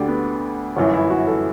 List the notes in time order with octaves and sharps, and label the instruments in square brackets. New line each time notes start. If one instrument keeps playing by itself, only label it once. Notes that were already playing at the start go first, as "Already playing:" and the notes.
Already playing: [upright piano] D2 D3 G4 D5
B3
G1 F#2 E3 C#4
E4
F#4
A4